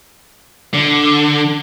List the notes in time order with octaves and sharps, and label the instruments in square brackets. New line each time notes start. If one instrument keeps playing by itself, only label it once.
[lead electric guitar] D3